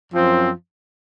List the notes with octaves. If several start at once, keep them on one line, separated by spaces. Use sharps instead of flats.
F#2 F3 C4